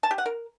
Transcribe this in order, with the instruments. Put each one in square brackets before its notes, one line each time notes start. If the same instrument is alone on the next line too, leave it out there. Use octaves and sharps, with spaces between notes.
[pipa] A5
G4
F#5
A#4